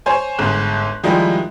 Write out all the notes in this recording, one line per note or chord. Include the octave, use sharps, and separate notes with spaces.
C5 C#5 G#5 C6
G1 G#2 F#6
D#3 F3 G3 G#3 D#4 E4